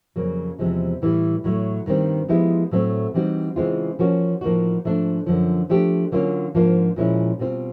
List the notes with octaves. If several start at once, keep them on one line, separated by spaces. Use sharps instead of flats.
F2 C#3 F#3 A#3
E2 C3 F3 G#3
A2 E3 G3
A2 F#3 A3
G2 D#3 G3 C4
F3 G#3 B3 E4 G4
A2 F#3 A3 C4
E3 G3 C4 D#4 F#4
C#3 E3 G#3 C4 F4
F3 A#3 C#4 F#4
A2 F3 A#3 D#4 F#4
G#2 F3 A3 D4
F#2 D3 F3
F3 A3 D4 G4
D3 F#3 A#3 C#4 F4
G#2 F3 A#3 D4 F4
A#2 F3 G#3 C#4 E4
B2 G3 C4 F4